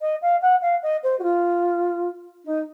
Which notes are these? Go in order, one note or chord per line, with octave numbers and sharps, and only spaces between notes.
D#5
F5
F#5
F5
D#5
C5
F#4
F4
D#4